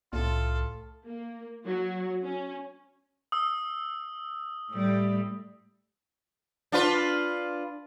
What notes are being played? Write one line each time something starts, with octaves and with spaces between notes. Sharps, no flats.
C2 A2 F4 A4
A#3
F#3
C#4
D#6 E6
A2 G3
D4 F4 B4